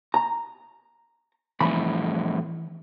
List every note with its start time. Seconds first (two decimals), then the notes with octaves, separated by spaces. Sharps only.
0.14 A#5
1.61 F2 A2 E3 B5